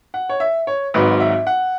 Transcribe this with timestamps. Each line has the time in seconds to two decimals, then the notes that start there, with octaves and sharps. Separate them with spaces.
0.14 F#5
0.29 C#5
0.40 E5
0.67 C#5
0.94 G#1 G#2 F#3 B4
1.20 E5
1.47 F#5